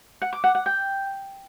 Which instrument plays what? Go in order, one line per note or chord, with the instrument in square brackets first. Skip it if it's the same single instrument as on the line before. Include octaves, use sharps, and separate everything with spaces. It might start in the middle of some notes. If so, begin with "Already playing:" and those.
[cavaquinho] F#5
D6
F#5
F#5
G5